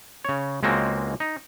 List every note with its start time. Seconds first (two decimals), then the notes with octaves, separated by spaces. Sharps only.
0.25 C#3 C#5
0.63 C#2 G#3 A#3 C4 F#4
1.20 D#4